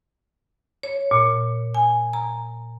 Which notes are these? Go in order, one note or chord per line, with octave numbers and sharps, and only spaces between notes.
C#5
A#2
G#5
A#5